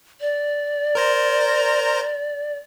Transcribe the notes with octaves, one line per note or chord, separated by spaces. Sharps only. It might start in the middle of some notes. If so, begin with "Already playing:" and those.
D5
A#4 C5 A#5